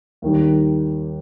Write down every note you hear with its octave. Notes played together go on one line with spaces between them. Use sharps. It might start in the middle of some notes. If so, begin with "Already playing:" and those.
D#2 D#3 G3